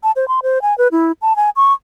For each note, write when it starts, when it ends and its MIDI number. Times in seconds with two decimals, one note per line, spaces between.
0.03 0.11 81
0.16 0.28 72
0.28 0.40 84
0.43 0.62 72
0.62 0.76 80
0.78 0.88 71
0.92 1.12 64
1.22 1.36 81
1.36 1.50 80
1.56 1.73 85